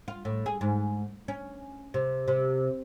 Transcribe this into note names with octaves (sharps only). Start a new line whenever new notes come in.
F4
A2
G#4
G#2
C#4
C3
C3